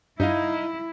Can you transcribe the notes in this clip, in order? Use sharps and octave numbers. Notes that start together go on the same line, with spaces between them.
G2 D#4 E4 D#5 F5